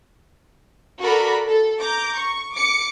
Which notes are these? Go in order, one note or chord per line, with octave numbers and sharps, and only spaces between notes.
F#4 A4 A#4 D5 A#5 B5
A4
A#5 D6 G6
C#6
D6 C#7